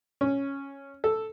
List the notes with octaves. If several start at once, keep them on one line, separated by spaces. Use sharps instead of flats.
C#4
A4